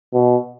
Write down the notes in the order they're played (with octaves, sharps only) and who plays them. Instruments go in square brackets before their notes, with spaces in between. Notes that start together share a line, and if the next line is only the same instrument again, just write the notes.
[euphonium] B2